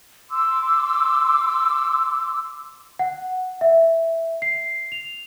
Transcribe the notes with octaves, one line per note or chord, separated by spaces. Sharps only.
C6 D6 E6
F#5
E5
C7
F7